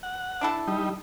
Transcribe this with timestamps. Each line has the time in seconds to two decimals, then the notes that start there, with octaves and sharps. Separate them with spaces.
0.03 F#5
0.41 D4 E4 A4
0.67 G3 D#4